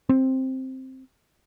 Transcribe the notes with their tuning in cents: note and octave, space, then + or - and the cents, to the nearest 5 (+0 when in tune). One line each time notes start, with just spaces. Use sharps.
C4 +5